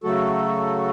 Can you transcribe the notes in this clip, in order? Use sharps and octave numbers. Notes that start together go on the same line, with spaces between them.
C#3 F#3 A3 F#4 A4